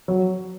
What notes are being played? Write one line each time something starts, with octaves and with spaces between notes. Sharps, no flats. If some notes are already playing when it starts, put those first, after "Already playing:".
F#3